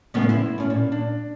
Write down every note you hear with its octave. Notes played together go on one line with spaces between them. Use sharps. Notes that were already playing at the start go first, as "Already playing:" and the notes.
A2 C#3 F3 G#3 A3 B3
E4 C5
A2 C#4
A#2
D4